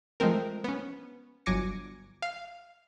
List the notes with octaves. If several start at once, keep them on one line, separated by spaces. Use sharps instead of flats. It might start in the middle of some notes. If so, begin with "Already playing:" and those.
F3 G#3 A3 C4 A#4
B3 C#4
G1 F#3 G#5 D6 A#6 C#7
F5